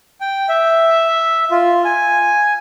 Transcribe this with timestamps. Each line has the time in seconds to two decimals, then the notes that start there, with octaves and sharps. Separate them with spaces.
0.21 G5
0.49 E5
1.51 F4
1.85 G#5